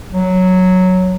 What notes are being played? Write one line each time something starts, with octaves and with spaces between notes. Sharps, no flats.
F#3